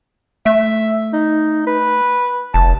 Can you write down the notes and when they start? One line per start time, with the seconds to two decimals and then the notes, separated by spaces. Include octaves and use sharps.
0.46 A3 E5
1.13 D#4
1.67 B4
2.54 F1 A5